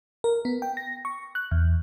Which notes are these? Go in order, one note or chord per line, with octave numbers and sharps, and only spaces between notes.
A#4
B3
G5
A#6
C#6
F#6
E2